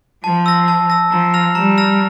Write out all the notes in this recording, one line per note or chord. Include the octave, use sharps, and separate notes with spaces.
F3 A5
E6 A#6
A5
E6 A#6
F3 A#5
F6 A#6 F7
G3 A#5
F6 A#6 F7